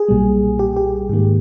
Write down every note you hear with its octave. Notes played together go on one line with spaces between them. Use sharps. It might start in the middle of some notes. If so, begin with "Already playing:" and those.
Already playing: G#4
B1 A#2 G3
G4
G4
G#2 D#3 A#3